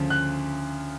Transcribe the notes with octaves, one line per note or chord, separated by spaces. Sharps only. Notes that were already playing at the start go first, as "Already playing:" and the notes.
Already playing: D2 C#3 F3
F#6